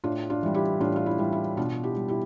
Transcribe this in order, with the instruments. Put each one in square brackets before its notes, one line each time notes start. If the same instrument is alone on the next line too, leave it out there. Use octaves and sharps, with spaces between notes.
[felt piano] A2 D4 F4
D4 F4
E3 G3
E4 G4
A2 D4 F4
F4
E4
E3 G3
E4
B2 D4 F4
E4 G4
G3
E4 G4